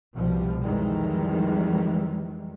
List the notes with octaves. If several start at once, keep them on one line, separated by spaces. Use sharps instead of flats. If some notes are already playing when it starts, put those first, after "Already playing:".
C2 B2 F3 G3
F2 D#3 E3 G3 G#3